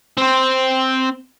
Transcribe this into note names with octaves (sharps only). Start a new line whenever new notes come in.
C4 C5